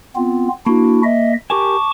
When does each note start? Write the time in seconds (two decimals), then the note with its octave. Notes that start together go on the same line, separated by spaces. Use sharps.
0.16 B3 C4 F4
0.66 A#3 D4 E4 F#4
1.04 D#5 E5
1.50 G4 A#4 G#5 A5 C#6 D6